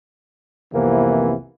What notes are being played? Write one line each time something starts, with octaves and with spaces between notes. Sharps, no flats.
C2 F2 C3 E3 A#3 B3